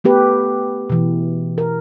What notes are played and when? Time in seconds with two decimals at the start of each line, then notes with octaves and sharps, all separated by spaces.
0.04 A3 B3 G4 B4
0.90 B2 E3
1.58 A#4